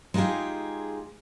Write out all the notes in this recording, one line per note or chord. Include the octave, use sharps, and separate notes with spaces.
G#3 D#4 F4 G4 G#4